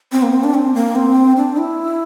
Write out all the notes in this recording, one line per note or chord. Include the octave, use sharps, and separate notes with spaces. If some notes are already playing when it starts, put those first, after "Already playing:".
C4
A#3
C4
D4
C4
A#3
C4
D4
E4